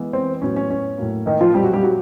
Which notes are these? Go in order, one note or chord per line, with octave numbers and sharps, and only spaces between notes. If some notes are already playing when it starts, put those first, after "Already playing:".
Already playing: E3 G#3 B3
C4
A2 F#3 B3 C#4
C#4
C#4
A2 F#3 A#3
D#3 D#4
F3 F4
A#2 G3 C4 G4
F#3 F#4
G3 G4
F#3 F#4